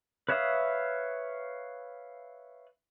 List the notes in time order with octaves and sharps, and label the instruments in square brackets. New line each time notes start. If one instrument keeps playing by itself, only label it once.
[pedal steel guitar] B4 C#5 E5 F5 D#6